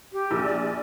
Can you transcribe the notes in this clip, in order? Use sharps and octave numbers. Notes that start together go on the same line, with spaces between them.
G4
A#1 E6
D5